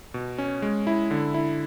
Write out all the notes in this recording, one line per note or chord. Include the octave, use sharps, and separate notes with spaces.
B2
C#4
G#3
E4
D3
E4